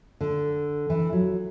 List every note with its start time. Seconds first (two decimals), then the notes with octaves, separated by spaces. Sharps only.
0.21 D3
0.90 E3
1.13 F#3